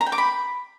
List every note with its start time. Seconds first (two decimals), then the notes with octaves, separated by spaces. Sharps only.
0.01 A#5
0.06 G5
0.12 D6
0.18 B5